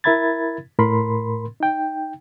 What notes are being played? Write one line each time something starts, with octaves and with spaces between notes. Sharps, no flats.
E4 A#4 E5 B5 G#6 A6
A2 A#4 B5 C6
D#4 G5